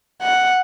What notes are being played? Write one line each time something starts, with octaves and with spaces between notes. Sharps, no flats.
F#5